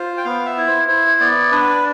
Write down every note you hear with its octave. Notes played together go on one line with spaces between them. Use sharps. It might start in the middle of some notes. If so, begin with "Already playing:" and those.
Already playing: F4 C5
G5
B3 F5
E5
E4
C5
E4 C5
B3 D5
D4 B4